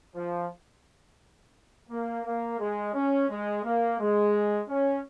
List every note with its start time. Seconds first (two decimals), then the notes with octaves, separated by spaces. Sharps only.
0.15 F3
1.90 A#3
2.25 A#3
2.59 G#3
2.94 C#4
3.30 G#3
3.64 A#3
3.99 G#3
4.68 C#4